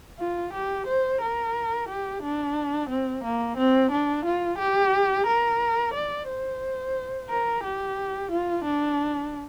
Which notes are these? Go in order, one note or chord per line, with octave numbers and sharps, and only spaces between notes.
F4
G4
C5
A#4
G4
D4
C4
A#3
C4
D4
F4
G4
A#4
D5
C5
A#4
G4
F4
D4